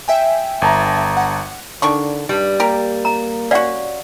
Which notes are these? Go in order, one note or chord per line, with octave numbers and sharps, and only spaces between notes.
E5 G5 G#5
G1 A5 A#5
F#5
D3 D#3 D4 C#6
G2 G3
A#3 G4 A#4
A#5
C#4 F#4 D5 F5 F#5